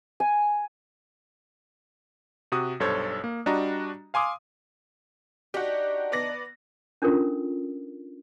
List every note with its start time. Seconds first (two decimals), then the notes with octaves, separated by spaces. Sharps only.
0.20 G#5
2.52 C3 F#4 D#6
2.80 B1 G2 A4 C5 C#5
3.24 A#3
3.46 G3 D4 F#4 D#5 A#5
4.14 F5 G#5 C6 D6 D#6
5.54 D4 D#4 F#4 G4
6.12 B3 D5 A#6
7.02 C#4 D4 F4 A4 A#4